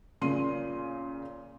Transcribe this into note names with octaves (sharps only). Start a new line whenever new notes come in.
A#2 C#3 C6 D#7